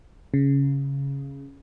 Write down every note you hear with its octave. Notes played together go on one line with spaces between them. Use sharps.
C#3